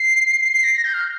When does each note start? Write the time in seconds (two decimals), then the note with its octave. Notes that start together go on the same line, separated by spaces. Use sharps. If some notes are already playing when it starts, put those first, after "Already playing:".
Already playing: C7
0.44 C7
0.54 C7
0.64 A#6
0.74 A#6
0.85 G6
0.94 F6